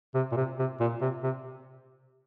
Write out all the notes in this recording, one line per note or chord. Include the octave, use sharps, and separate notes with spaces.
C3
A#2
C3
C3
A#2
C3
C3